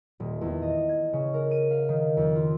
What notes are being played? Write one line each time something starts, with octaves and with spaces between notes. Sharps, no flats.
D#1
E2
D#5
G#6
C#3
A#4
D#7
F5
D#3
F2
F4